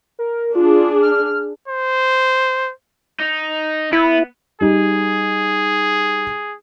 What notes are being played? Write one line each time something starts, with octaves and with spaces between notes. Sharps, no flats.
A#4
D4 F4 G#4
F6
C5
D#4
B3 E4
G3 D#4 G#4